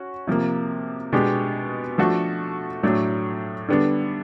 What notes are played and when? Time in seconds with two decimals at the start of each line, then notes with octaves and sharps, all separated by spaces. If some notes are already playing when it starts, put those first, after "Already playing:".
Already playing: C#4 F#4
0.27 C3 F3 A#3
1.12 B2 G#3 B3 D4 G4
1.98 F3 A3 D4 F#4 A4
2.83 A2 F#3 A3 D4
3.68 D3 G3 B3 D4